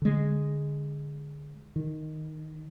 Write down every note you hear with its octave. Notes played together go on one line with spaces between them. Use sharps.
D3 G#3
D#3